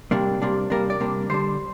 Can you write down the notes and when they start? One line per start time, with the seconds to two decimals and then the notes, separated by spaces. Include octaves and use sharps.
0.11 C3 G3 A#3 D4
0.42 C3 G3 A#3 D4
0.70 C3 G3 A#3 D4 A#4
0.90 D5
1.00 C3 G3 A#3 D4
1.30 D3 G3 D4 C5